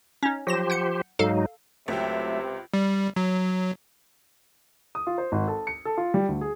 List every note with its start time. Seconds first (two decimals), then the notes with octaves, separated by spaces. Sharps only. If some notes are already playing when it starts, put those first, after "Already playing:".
0.23 C#4 D#4
0.47 F3 F#3 G4 C5 A#6 E7
0.70 F#5 G6 C#7
1.19 G#2 F#3 D#4 A4 F5
1.88 C#2 C3 F#3 A3 G4 E5
2.74 G3
3.16 F#3
4.95 D#6
5.07 F4
5.18 C5
5.32 G#1
5.48 A4
5.67 C#7
5.85 A4
5.97 F4
6.14 G3
6.28 D2
6.41 G#4